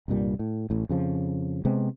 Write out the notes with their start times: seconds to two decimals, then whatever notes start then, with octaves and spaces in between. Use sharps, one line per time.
0.08 C2 G2 A#2 G3
0.39 A2
0.70 A1 A2
0.89 F2 C#3 F3
1.65 C3 G#3 B3 C4